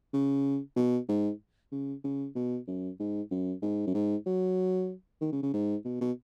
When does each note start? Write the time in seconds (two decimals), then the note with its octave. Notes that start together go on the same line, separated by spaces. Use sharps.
0.14 C#3
0.76 B2
1.08 G#2
1.72 C#3
2.04 C#3
2.35 B2
2.68 F#2
3.00 G#2
3.31 F#2
3.62 G#2
3.87 F#2
3.94 G#2
4.26 F#3
5.21 D#3
5.32 C#3
5.42 C#3
5.54 G#2
5.85 B2
6.01 B2